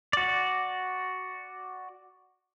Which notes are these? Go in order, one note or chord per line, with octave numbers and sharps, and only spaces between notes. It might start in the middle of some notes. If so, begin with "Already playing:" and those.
F#4 D5